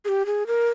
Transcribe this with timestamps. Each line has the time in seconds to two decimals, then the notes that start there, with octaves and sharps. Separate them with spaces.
0.05 G#4
0.08 G4
0.26 G#4
0.47 A#4